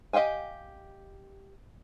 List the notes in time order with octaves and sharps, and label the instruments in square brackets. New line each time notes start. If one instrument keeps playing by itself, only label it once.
[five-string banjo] G4 D#5 F5 G5 G#5